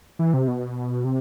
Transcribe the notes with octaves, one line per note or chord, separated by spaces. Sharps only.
E3
C3
B2
C3